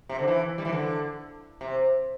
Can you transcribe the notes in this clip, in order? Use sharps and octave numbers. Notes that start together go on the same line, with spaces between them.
C3
D3
E3
G3
E3
D3
C3